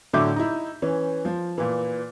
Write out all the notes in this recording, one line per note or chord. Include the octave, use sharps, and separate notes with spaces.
A2 D3 F#3 E5 D6 G6
D#4 E4
E3 C#4
F3
A#2 E3